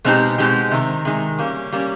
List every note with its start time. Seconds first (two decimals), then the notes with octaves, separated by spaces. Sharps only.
0.05 B2 G#3 C4 D#4 G4
0.38 B2 G#3 C4 D#4 G4
0.71 C3 D#3 G#3
1.05 C3 D#3 G#3
1.39 G3 A#3 C#4
1.73 G3 A#3 C#4